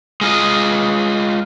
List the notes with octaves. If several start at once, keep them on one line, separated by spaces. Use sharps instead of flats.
G#3 F4 D#5